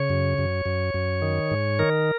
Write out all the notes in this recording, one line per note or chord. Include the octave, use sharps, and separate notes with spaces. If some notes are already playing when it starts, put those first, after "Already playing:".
Already playing: C#3 C#5
F#2
F#2
F#2
F#2
D#3
G#2
D#3 A#4